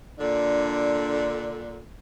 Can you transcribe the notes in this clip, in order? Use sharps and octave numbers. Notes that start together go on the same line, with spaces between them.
A#2 D3 D4